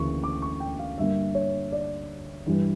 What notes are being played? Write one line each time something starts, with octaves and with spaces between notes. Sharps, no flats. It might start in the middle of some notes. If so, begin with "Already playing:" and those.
Already playing: D2 C#3 E3 A#3 C#6
D6
C#6
G5
F5
G2 D3 G3 A#3 E5
C#5
D5
G2 E3 G3